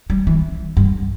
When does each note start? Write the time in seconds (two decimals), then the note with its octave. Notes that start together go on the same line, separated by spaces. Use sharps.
0.10 G3
0.27 E3
0.77 G2